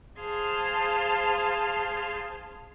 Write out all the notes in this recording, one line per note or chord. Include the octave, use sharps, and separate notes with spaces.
G#4 C5 F5 A5 C6 F6